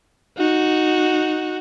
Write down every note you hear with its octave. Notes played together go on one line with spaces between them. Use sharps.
D#4 F#4